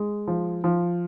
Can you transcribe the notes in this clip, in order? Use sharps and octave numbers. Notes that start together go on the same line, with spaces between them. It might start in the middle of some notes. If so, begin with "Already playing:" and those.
Already playing: G#3
F3
F3